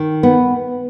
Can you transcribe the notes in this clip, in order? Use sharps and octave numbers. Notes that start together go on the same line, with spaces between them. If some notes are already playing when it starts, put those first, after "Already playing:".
Already playing: D#3
B3